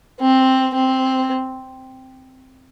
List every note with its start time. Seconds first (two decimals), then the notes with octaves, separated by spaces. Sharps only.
0.21 C4
0.75 C4